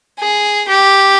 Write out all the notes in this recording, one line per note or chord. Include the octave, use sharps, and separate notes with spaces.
G#4
G4